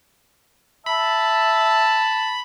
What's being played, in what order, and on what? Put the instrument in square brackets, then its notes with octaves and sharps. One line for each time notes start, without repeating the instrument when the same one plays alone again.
[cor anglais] E5 [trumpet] A5 [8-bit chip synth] B5